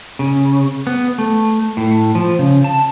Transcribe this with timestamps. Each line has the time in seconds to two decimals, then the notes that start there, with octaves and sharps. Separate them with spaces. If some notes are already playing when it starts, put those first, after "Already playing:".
0.19 C#3
0.87 B3
1.18 A3
1.77 A2
2.15 F3
2.39 C#3
2.64 A5